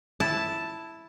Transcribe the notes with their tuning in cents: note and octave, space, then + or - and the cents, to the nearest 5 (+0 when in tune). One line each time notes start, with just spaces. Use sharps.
E4 +0 A5 +0